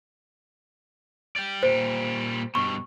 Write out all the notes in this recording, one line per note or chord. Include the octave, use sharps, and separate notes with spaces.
D5 G5
A#2 G3 C5
G2 B2 C#6